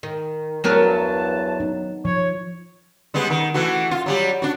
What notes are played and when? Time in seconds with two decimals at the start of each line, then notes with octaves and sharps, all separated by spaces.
0.03 D#3
0.64 E2 G2 F#3 B3 A#4 A5
1.60 D#4
2.05 F3 C#5
3.14 G3 G#3 B3
3.30 D#3
3.54 E3 A3 F#4
3.91 F4
4.06 F#3 G3 G4
4.42 D4 F#4